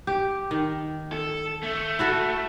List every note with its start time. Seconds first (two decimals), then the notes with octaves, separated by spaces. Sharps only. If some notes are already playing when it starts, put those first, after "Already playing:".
0.07 G4
0.51 D#3
1.12 A4
1.63 A3
1.99 E4 F#4 A4